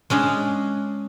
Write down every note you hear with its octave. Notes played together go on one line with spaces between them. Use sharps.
G#3 C#4 D4 G#4